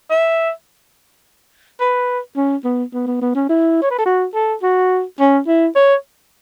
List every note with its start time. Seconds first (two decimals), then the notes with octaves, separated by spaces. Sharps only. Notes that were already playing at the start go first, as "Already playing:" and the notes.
0.11 E5
1.80 B4
2.37 C#4
2.64 B3
2.94 B3
3.07 B3
3.22 B3
3.35 C#4
3.49 E4
3.82 C#5
3.90 B4
3.99 A4
4.06 F#4
4.35 A4
4.63 F#4
5.19 C#4
5.47 E4
5.75 C#5